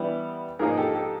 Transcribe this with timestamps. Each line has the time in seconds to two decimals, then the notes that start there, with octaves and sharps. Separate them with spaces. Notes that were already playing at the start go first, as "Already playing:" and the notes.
Already playing: E3 G3 B3 E4
0.59 G#2 F3 A#3 D#4 G#4 A#4
0.77 G4 A4
0.95 G4 A4